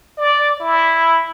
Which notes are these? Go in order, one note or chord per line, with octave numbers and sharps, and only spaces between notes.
D5
E4